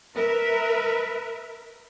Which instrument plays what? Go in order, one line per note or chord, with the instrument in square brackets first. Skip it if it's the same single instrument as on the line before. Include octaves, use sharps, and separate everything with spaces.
[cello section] A#4 B4 E5